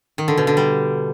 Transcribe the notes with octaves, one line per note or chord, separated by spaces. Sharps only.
D#3
D3
B2
D3
G3